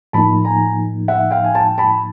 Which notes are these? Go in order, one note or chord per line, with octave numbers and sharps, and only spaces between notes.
A2 F3 A#3 D#4 A5 B5
G#5 A#5
E5 F#5
F5 G5
G#5
G5 A5
A5 B5